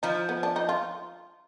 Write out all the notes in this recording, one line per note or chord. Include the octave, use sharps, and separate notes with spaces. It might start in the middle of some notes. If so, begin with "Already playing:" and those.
F3 D#4
B3
D4
D#4
F4